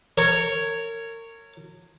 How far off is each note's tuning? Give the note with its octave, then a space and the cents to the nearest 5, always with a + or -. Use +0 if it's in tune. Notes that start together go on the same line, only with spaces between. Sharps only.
A#4 -30 C#5 +0